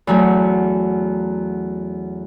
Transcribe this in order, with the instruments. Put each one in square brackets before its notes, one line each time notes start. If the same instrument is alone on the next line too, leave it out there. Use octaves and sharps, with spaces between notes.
[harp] E2 F#3 A3 C#4